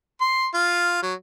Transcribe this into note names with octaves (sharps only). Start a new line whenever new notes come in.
C6
F4
F#3